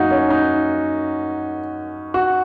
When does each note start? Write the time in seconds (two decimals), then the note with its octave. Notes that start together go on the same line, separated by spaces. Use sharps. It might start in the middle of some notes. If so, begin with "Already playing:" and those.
Already playing: F#2 F#3 A#3 D#4 F#4
0.11 C#4
0.30 D#4
2.14 F#4